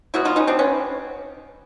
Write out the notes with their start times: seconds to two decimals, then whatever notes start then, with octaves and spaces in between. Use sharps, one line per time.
0.14 B2 F#3 B3 E4 F#4
0.25 D#4 F4
0.36 C#4 D#4
0.47 C4 D4
0.59 B3 C#4